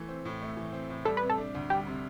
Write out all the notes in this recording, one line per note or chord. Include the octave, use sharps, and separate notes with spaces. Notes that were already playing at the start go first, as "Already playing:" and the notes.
Already playing: E3 A3
C4
A2
A3
E3
C4
A2
G3 A4
B4
C3
A4
D4
D2
G3 G4
C3